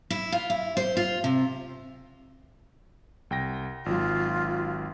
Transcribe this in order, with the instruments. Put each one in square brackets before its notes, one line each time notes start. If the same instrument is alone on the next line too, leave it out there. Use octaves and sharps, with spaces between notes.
[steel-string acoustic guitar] E4
F4
E4
C5
F4
C3
[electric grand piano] C2 G5 A#6
[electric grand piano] G#1 F#3 [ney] F4